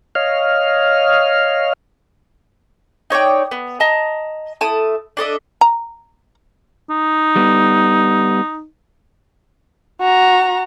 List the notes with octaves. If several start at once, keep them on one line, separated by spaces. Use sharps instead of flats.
C#5 D#5 F5 F6
D#4 C#5 D5 G5
B3
D#5 A5 A#5
A3 E4 A5 D#6
D4 A4 D#5 E5
A#5
D#4
G3 B3
F#4 A#5